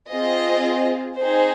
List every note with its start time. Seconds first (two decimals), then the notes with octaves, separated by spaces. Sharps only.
0.10 C4 F4 G#4 D#5
1.18 C4 D#4 G#4 C5